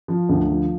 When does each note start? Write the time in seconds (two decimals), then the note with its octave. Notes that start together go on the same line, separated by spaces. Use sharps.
0.08 F3
0.29 D2
0.49 F3